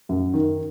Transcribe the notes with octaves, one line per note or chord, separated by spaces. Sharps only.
F#2
D#3